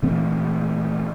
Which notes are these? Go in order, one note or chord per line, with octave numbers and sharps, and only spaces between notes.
A#2 E3 A3 C4